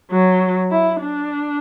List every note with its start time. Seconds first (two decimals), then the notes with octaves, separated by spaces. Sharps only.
0.11 F#3
0.71 E4
1.00 D4